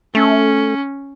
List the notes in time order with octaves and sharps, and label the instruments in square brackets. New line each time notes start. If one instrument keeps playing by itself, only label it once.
[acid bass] A3 [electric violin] C#4